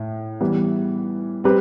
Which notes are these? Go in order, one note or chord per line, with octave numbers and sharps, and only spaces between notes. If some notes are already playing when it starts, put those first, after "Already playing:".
Already playing: A2
E3 G3 B3
G3 C4 G4 B4